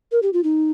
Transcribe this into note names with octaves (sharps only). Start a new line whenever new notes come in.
A#4
G4
F4
D#4